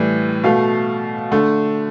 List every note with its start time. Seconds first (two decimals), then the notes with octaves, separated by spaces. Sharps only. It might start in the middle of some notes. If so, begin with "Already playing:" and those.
Already playing: A2 E3 G3
0.43 B2 A3 F5
1.32 D3 A3